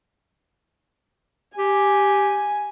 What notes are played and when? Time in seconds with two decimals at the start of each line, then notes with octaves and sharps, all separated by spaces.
1.58 G4 G#5